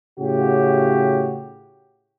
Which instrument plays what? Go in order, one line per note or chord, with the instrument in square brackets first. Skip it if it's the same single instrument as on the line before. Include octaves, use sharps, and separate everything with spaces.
[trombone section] A2 C#3 F#4 G4